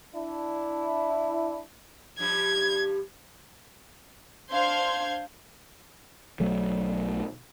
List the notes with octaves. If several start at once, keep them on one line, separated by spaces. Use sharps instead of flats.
D4 E4
G2 F3 G3 G#6
D4 C5 F5 C6 G6 G#6
B1 F#3 A3